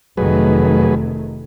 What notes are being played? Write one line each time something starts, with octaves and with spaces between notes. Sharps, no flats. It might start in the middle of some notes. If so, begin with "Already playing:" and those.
F1 D#3 F#3 A3 G#4 B4